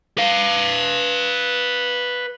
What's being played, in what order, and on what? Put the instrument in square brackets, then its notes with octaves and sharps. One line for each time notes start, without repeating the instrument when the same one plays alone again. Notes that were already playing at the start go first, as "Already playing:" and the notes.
[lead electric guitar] B4 F5